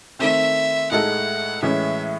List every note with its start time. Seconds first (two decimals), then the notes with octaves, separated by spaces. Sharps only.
0.19 D#3 A3 C4 E5
0.91 A2 G#3 D#4 A4 F#5
1.62 A2 E3 G#3 C#4 E5